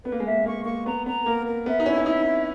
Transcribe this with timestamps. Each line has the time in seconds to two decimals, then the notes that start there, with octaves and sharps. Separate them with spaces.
0.05 B3 B4
0.12 A#3
0.20 G#3
0.25 A#3 E5
0.46 A#3 C#6
0.65 A#3 C#6
0.86 B3 A#5
1.06 B3 A#5
1.25 A#3 A#4
1.46 A#4
1.66 B3 E5
1.80 D#4
1.86 C#4 E4
1.97 C#4
2.06 D#4 E5
2.26 E4